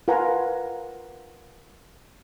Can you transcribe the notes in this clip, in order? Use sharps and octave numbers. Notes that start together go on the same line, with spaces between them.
F4 A#4 B4 F#5 G#5 A#5